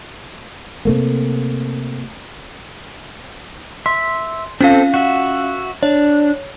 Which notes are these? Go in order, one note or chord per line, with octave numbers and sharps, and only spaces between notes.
C3 A3 A#3
E5 C6
C4 C#4 F4 A4 F5
F#4 E5
D4 C#5